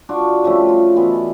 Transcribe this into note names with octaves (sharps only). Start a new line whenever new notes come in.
D4 F4 F#4
C#3 F3 G3 A3
F4
B2 E3 B3
D5